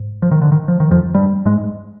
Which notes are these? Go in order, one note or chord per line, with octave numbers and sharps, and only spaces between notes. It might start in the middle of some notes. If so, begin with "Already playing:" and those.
Already playing: G#2
F3
D#3
D3
D#3
F3
D#3
F2 F3
G2 G3
G#2 G#3